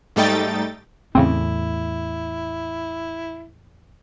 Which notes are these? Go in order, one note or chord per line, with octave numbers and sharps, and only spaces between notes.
G#2 G3 A3 D#4 G5 A6
E2 A2 C#3 C4 E4